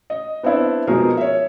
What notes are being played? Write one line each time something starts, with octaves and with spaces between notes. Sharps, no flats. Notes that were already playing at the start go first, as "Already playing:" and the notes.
D#5
B3 C4 D4 E4
B2 F3 G#3 D#4 G#4 A#4
C#5 E5